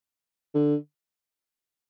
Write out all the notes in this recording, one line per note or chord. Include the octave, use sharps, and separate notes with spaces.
D3